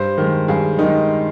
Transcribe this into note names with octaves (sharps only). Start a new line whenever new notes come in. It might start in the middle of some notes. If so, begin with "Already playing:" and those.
Already playing: G2 C5
D#3 G#3
G2 G#4
D#3 G#3 D#4